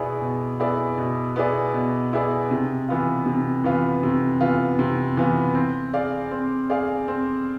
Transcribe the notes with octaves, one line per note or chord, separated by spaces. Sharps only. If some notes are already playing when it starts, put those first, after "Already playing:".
Already playing: B2 B3 E4 G#4 D5
B2
B3 E4 G#4 D5
B2
B3 E4 G#4 D5
B2
B3 E4 G#4 D5
C3
E3 B3 F4
C3
E3 B3 F4
C3
E3 B3 F4
C3
E3 B3 F4
C4
G#4 D5 F5
C4
G#4 D5 F5
C4